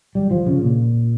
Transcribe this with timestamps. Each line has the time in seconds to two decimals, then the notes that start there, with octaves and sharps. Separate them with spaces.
0.15 G3
0.31 F3
0.47 C#3
0.62 A#2